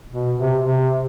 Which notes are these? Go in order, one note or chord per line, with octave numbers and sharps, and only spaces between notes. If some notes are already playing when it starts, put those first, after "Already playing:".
B2
C3
C3